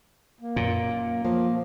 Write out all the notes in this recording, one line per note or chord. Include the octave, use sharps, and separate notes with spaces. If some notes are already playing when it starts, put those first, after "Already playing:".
A#3
F#2 A#2
F3 A#3